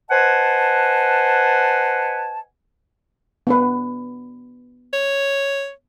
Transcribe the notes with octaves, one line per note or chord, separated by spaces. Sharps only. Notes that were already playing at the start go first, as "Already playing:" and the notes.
B4 C5 D#5 F#5 G#5 A5
B3 D4 B4
C#5